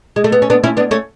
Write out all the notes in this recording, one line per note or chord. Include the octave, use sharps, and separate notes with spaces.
G#3
A3
B3
C#4
B3 D4
C#4 E4
B3 D4
A3 C#4